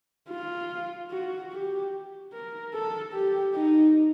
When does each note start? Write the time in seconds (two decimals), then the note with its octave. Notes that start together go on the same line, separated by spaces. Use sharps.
0.30 F4
1.11 F#4
1.52 G4
2.33 A#4
2.73 A4
3.14 G4
3.55 D#4